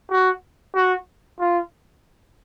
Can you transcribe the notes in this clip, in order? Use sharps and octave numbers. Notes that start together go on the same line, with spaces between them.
F#4
F#4
F4